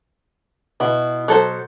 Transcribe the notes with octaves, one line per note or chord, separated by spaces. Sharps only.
B2 E4
F#3 A4 C5